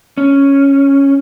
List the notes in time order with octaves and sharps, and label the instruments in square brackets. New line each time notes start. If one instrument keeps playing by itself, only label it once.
[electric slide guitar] C#4